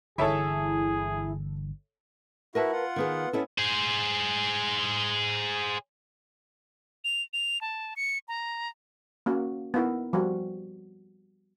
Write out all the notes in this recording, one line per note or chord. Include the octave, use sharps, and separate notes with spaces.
G1 D3 E3 E4 G#4 A4 C#5 E5
E4 F#4 A#4 B4 A5
F4 F#5
D#3 B3 G#4
B3 C#4 E4 A4
G#4 C5
F7
F7
A5
C#7
A#5
A#3 C#4 F#4
B3 D#4 E4 A#4
F3 G3 F#4